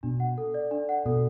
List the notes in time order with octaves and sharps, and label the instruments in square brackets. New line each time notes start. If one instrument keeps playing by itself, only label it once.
[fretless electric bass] B2 [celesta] D4
[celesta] F#5
A4
D5
D4
F#5
[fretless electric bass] B2 [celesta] A4